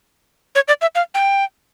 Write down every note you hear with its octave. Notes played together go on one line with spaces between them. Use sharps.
C#5
D5
E5
F5
G5